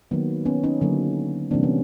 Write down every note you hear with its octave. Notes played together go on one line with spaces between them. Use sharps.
D#3 F#3 A#3 B3
B3 C#4
C#4 D#4
D3 F#3 A#3
C3 E3 G3 A#3 C4 D4
B3 C#4